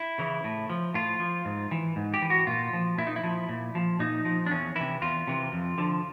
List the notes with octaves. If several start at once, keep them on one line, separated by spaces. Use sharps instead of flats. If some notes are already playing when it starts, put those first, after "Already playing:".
Already playing: E4
C#3 E3
A2
F3
A2 F4
F3
G#2
E3
G#2
G4
E3
F#4
A#2 F4
F3
A#2 E4
D#4
E4
F3
A#2
F3
A#2 D#4
F3
D4
E2 C#4
C3 E3 E4
E2 F4
C3 E3
F2
D3 F3